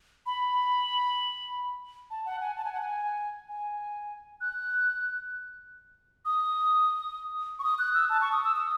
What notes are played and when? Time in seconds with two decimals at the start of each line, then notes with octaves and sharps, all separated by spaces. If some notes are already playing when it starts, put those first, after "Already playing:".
0.26 B5
2.10 A5
2.26 F#5
2.41 G#5
2.57 A5
2.64 G#5
2.73 F#5
2.81 G#5
3.48 G#5
4.41 F#6
6.25 D#6
7.59 C#6
7.64 D#6
7.79 F#6
7.94 E6
8.09 A5
8.21 C#6
8.32 D#6
8.44 E6
8.56 D#6